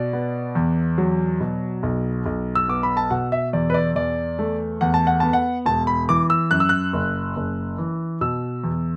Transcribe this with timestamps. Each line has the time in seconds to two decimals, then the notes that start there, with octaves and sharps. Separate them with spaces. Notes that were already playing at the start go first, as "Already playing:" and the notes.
Already playing: B2 D5
0.13 B3
0.55 E2
0.98 F#3
1.40 B2
1.83 B1
2.26 B1
2.55 E6
2.68 B3 D6
2.83 B5
2.97 A5
3.10 B2 F#5
3.32 E5
3.53 E2 D5
3.70 B4
3.74 D5
3.96 E2 D5
4.39 A3
4.81 E2 F#5
4.94 A5
5.07 F#5
5.20 B3 A5
5.33 F#5
5.66 E1 A5
5.87 B5
6.09 E3 D6
6.30 E6
6.51 F#2 F#6
6.60 E6
6.69 F#6
6.93 F#1
7.37 F#1
7.78 E3
8.21 B2 E6
8.64 E2